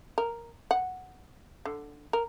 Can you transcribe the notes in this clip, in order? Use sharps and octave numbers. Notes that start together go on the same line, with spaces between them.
A#4
F#5
D3
A#4